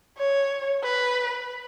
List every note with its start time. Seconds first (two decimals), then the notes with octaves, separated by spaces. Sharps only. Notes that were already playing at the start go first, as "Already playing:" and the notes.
0.18 C#5
0.84 B4